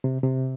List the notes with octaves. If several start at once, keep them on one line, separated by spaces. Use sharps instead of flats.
C3
C3